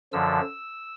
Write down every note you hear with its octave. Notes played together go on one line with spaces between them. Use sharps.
F#2 D3 F3 E6